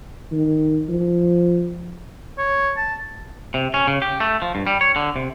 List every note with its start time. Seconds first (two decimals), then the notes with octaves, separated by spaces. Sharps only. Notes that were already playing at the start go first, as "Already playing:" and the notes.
0.32 D#3
0.89 F3
2.38 C#5
2.77 A5
3.54 C3
3.74 C#4
3.87 C#3
4.02 G4
4.20 A3
4.42 F3
4.55 G2
4.67 G3
4.81 C#5
4.96 D3
5.16 C3